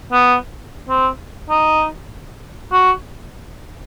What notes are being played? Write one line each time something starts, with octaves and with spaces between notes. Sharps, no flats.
B3
C4
D#4
F#4